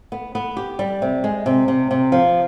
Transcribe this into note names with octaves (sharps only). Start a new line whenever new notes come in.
B3
B3
G4
G3
C3
G#3
C3
C3
C3
F3